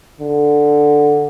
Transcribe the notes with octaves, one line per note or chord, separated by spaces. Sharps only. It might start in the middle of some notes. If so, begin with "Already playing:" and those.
D3